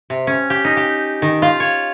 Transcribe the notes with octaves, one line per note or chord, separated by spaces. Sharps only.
C3
C#4
G4
D#4
G4
D#3
F4
C#5